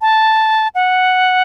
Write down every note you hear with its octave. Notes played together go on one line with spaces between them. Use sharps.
A5
F#5